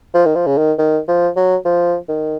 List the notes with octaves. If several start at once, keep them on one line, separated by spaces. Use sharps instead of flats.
F3
D#3
F3
C#3
D#3
D#3
F3
F#3
F3
D#3